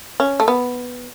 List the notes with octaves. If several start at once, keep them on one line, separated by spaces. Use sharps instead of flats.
C#4
A3
B3